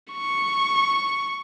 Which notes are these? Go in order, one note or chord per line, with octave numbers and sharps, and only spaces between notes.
C#6